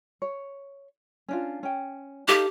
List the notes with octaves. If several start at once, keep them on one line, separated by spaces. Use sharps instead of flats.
C#5
C#4 D4 F4
C#4 G5
D#4 G4 A4 F5